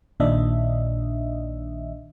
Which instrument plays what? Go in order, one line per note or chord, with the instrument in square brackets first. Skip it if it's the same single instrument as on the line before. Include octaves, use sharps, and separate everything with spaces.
[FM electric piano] A#1 A#2 D#3 D4 D#5 E5